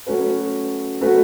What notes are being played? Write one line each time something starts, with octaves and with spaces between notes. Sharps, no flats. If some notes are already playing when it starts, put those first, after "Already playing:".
F#3 A3 C#4 F#4 B4
F#3 A3 C#4 F#4 B4